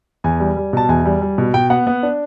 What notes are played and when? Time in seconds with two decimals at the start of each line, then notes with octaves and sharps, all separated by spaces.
0.24 E2 G#5
0.40 G3
0.57 G3
0.73 B2 A5
0.89 E2 G#5
1.05 G3
1.22 G3
1.38 B2
1.54 B2 G5
1.70 B3 F#5
1.87 B3
2.03 D4